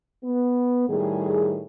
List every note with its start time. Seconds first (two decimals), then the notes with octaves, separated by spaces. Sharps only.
0.24 B3
0.88 A2 D#3 G3 G#4